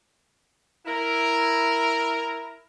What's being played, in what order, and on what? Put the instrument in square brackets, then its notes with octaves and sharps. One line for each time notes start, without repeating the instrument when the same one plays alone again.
[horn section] E4 A#4